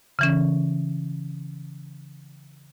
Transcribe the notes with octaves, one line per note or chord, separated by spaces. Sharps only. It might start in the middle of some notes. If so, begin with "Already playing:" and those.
C#3 E3 C#4